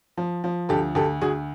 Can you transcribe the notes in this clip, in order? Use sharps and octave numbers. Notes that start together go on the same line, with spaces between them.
F3
F3
D2 G4 A4
D2 G4 A4
D2 F#4 G#4